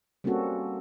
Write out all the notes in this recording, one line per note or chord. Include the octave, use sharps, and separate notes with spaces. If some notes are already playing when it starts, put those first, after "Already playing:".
G3 A#3 C4 C#4 F#4 A4